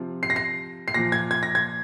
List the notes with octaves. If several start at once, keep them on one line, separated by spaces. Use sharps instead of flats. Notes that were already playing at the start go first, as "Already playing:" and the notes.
Already playing: C3 F3
C7
A#6
C7
C7
A#2 F3 A#6
G#6
G#6
A#6
G#6